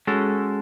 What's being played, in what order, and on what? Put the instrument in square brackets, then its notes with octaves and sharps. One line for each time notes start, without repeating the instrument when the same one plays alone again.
[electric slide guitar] G#3 C#4 F#4 A4